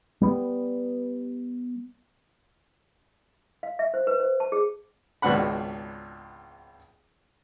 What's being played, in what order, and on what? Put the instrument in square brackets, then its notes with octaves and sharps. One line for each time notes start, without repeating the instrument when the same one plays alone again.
[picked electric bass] G3 B3
[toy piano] F5
E5
C5
B4
C5
A5
G#4
[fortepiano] G#1 C#2 B2 D4 F#5 B5